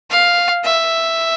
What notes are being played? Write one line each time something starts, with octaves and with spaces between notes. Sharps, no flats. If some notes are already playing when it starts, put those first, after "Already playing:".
F5
E5